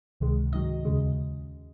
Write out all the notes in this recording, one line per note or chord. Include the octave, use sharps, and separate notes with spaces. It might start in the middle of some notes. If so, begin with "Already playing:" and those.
C#2 C3 D#3 G#3
G#2 D#3 F#3 D#5
D#2 C#3 G#3